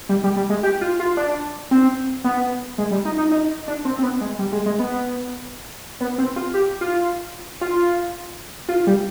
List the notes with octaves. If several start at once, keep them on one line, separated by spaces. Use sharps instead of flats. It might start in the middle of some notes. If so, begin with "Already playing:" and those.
G3
G3
G3
G#3
G4
F4
F4
D4
C4
B3
G#3
G3
D#4
D#4
D#4
D4
C4
C4
B3
G#3
G3
G#3
G#3
B3
B3
C4
F4
G4
F4
F4
F4
G3